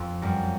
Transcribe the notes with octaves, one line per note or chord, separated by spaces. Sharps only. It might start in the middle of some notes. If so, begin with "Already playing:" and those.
Already playing: F2
F#2 G3